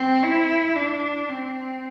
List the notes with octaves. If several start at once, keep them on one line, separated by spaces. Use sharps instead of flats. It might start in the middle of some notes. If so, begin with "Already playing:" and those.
Already playing: C4
E4
D4
C4